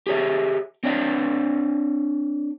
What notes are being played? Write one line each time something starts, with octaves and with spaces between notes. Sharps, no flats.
G4 G#4 C#5 E5
C4 D4 C#5 D#5 F5 G5